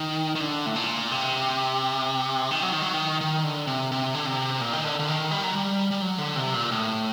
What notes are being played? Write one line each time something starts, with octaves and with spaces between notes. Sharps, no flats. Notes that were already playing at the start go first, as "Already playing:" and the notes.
Already playing: D#3
D#3
D3
A2
A#2
C3
D#3
F#3
D#3
F#3
D#3
D#3
D3
C3
C3
D3
C3
A#2
D#3
D3
D3
D#3
G3
F#3
G3
G3
F#3
D3
C3
A#2
A2